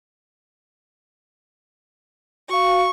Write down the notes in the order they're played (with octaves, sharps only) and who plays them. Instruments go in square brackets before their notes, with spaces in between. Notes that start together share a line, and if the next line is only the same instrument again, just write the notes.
[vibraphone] F#4 F5 [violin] C#6